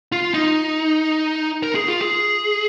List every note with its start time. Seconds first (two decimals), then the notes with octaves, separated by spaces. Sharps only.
0.12 F4
0.34 D#4
1.63 A#4
1.75 G#4
1.88 F4
2.01 G#4